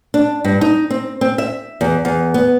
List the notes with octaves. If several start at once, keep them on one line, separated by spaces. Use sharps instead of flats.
D4
G2
D#4
C4
C4
E5
E2
E2
B3